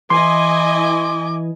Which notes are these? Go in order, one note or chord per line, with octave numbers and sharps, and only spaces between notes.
E3 E4 D#5 G#5 C6 D6